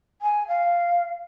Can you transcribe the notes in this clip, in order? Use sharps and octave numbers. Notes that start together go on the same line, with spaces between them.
G#5
F5